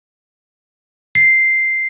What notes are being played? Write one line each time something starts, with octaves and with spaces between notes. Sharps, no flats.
C7